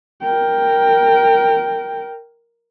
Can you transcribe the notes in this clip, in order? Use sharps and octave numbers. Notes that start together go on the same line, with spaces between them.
A#4 G5